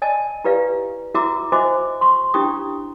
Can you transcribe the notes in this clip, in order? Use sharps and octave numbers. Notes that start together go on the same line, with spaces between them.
D5 D#5 G#5 A5
E4 G4 B4 D5 F5
E4 F#4 E5 A#5 D6 E6
F#4 C5 D#5 E5 G#5 D6
C6 C#6
C#4 D4 E4 G4 C#6 D#6